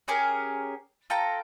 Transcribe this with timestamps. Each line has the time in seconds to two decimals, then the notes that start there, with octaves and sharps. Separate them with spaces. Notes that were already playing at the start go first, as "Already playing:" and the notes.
0.08 C#4 G4 G#4 A#4
1.10 F4 A4 G5 A#5